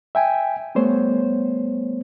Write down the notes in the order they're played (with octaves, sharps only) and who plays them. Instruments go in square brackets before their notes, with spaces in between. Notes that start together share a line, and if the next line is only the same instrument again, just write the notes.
[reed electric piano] E5 G5 G#5
G3 A3 B3 C5 C#5